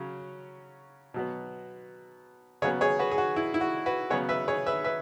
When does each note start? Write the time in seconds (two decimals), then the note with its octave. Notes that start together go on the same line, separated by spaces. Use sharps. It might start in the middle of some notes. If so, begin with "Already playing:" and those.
Already playing: C#3 F#3 C#4
1.14 B2 F#3 B3
2.62 C#3 F#3 B3 G#4 C#5
2.81 G#4 C#5
2.99 F#4 B4
3.11 G#4
3.18 F#4
3.36 E4
3.54 E4
3.61 F#4
3.86 F#4 B4
4.10 C#3 F#3 B3 G#4 C#5
4.29 B4 E5
4.48 G#4 C#5
4.66 B4 E5
4.84 B4 E5